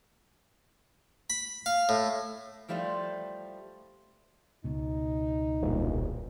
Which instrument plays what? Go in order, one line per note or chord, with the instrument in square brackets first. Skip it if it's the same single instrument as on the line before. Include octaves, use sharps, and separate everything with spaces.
[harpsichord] B5
F5
A2
[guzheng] F3 G3 A3 E4 F4
[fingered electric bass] C#2 B2 [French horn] D#4
[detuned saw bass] E1 [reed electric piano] G2 A#2